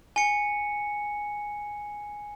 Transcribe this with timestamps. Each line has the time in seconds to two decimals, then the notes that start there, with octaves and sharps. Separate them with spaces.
0.16 G#5 C#7